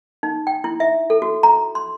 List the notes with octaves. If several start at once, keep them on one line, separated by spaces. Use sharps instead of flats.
D#4
G5
E4
E5
A4
F#4
A#5
C6